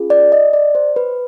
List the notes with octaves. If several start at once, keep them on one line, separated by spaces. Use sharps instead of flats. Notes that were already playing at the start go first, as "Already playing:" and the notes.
Already playing: C#4 F4 G#4
D5
D#5
D5
C5
B4